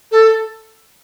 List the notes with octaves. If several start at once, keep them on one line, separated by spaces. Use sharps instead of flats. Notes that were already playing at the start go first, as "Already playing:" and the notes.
A4